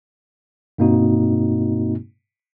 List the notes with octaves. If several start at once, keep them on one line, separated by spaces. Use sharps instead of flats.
G2 B2 A#3 C4 D#4 F#4